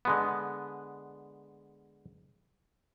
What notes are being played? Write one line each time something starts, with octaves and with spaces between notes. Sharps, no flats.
D3 G#3 B3